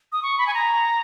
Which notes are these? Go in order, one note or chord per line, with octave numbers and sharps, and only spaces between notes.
D#6
C#6
B5
G#5
A#5